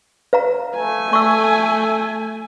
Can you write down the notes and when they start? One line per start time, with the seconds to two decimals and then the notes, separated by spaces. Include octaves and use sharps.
0.33 B4 F5 A#5
0.75 A3 G#5
1.13 A3 A4 C#6 E6